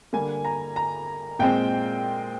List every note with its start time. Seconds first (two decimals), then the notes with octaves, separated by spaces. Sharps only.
0.13 D3 G3 A#3 G#5
0.45 A#5
0.76 A#5
1.39 A#2 G#3 C4 G5